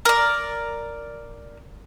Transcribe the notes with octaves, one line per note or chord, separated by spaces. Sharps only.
A#4 D5